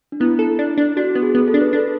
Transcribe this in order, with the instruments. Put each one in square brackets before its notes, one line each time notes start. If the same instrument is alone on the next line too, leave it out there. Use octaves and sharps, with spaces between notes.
[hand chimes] D4
[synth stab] B3 [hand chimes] E4
[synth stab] A4
D4
D4
[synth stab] D4 [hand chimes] F#4
[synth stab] B3
[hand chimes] G#4
[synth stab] B3
[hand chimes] A4
[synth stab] D4
[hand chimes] B4
[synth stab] D4 [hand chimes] A4